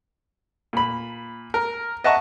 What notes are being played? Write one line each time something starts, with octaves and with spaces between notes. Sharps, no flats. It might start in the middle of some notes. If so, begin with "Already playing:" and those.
A#2 B5
A#4
D#5 E5 F#5 A5 A#5 C#6